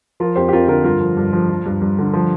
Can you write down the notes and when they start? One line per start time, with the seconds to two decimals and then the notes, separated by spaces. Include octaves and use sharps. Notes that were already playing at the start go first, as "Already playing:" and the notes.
0.20 F3 F4 A#4
0.36 F2 G4 C5
0.49 G4
0.53 F2 F4 A#4
0.68 D3 F4 A#4
0.84 G2 F4 A#4
1.00 F3
1.17 G2
1.33 F3
1.50 F3
1.66 G2
1.82 G2
1.99 D3
2.14 F3